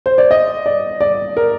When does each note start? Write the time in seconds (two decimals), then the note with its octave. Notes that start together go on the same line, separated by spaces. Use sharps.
0.06 C5
0.18 D5
0.31 D#5
0.66 D5
1.01 D5
1.37 A#4